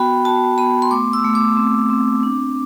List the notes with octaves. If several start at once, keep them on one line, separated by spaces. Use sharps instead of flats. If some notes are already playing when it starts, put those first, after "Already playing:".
Already playing: B3 F#4 G5 B5
F#4 A5
B3 B5
C6
A3 D6
E6
A3
D6
C4
C4
D4